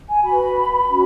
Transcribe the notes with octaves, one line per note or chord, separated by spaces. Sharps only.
G#5
F#4 B4 B5
C#4 F#4